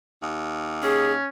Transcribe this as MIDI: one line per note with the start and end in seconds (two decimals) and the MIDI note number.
0.23 1.15 39
0.83 1.29 61
0.83 1.11 68